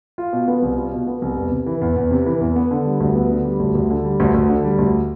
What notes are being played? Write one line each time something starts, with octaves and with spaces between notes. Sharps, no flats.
F4
B2
B3
C2
F4
B2
B3
C2
E2
C3
E3
E2
E2
C3
E3
E2
B3
D3
G3
D2
B3
D3
G3
D2
D2
D3
G3
D2
D2
D3
G3
D2